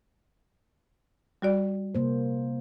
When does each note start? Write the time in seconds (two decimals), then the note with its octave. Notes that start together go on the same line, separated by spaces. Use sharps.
1.42 G3 F#4 D5
1.95 C3 A#3 C5